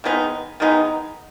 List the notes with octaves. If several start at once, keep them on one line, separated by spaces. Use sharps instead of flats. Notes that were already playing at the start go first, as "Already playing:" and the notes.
D#3 G#3 B3 D#4
D#3 G#3 B3 D#4